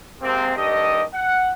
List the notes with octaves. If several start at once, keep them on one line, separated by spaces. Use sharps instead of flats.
C3 G#3 A#3 C4
G2 D#3 G4 A4 D#5
F#5